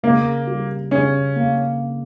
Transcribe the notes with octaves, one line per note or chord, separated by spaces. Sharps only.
C#3 A#3
G3
C#3 C#4
A#3